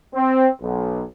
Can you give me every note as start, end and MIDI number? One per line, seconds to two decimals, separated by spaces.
0.15 0.49 60
0.62 1.03 35